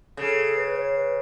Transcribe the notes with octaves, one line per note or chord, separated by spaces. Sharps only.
C#3 A4
B4
C#5
B4